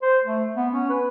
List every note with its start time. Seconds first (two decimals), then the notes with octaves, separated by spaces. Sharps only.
0.02 C5
0.24 A3
0.57 B3
0.72 C#4
0.90 B4